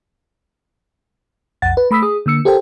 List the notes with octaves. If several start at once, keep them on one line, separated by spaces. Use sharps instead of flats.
B1 F2 F#5 A6
B4
A3 B5 D#6 E6 B6
G#4 D#6
D3 A#3 E6 C#7
G4 A4 A#4 C5 G5